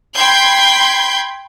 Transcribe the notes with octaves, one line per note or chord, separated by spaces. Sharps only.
G5 B5 C6 G6 G#6